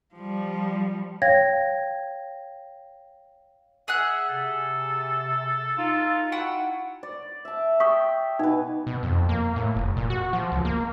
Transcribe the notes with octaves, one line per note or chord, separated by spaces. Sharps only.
F3 G3
C#5 F5 G5 G#6 A#6
G#4 E5 F#5 F#6
C3 A4
D#4 F4
E4 F#4 F#5 G5
D5
E5 A5
G5 C#6 D#6 B6
B2 D#4 B4
B2
F2
A#3
A2
F1
A#2
F#4
F3
C#2
A#3